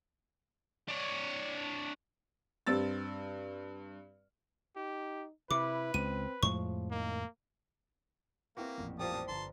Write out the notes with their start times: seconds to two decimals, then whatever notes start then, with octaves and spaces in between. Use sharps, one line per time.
0.88 D4 C#5
2.67 G2 C4 E6 A6
4.76 D#4 G4
5.51 C3 E4 B4 D6
5.94 C#2 C4 D#7
6.43 F2 A2 F3 G#3 C#6
6.91 D#3 A#3
8.57 A#3 C4 E4 F#4 G4 B4 E5
8.78 A1 F2 A#2
8.99 F3 G3 A#3 A5 D#6
9.13 F3 D4
9.28 G1 A5 A#5 C6